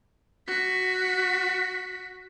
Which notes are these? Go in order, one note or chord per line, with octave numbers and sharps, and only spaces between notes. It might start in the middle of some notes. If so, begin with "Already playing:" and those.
F#4 B6